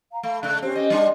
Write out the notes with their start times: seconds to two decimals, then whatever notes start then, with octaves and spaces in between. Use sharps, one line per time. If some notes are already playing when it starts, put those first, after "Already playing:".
0.12 F5 A#5
0.23 A3 F5 B5
0.43 C#3 A3 F#6
0.62 C4 C#4 G4 C5
0.75 C4 D#5
0.90 G3 D4 C6